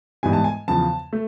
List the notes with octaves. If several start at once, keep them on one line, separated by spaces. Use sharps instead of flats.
G#2 E3 G3 B3 G#5
A5
G#5
E2 C#3 F3 A5
A3